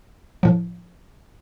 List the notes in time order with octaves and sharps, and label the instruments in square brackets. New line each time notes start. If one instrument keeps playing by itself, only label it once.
[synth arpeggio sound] A2 F3